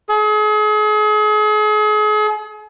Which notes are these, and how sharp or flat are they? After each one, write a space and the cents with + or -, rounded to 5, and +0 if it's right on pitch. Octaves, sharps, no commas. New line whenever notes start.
G#4 +40